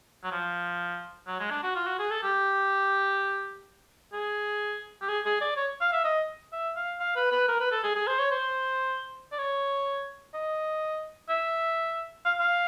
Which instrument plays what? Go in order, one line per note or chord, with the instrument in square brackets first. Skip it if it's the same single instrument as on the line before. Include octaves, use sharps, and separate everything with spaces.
[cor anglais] F#3
F3
F#3
G#3
D4
F#4
F4
F#4
G#4
A4
G4
G#4
G4
G#4
G#4
D5
C#5
F5
E5
D#5
E5
F5
F5
B4
B4
A#4
B4
A4
G#4
G#4
C5
C#5
C5
D5
C#5
D#5
E5
F5
F5